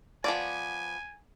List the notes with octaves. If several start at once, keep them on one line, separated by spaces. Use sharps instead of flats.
F3 B3 D5 G#5